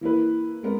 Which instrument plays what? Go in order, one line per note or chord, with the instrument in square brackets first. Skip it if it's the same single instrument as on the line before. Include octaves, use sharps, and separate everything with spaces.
[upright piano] E3 A#3 E4 B4
G#3 B3 A#4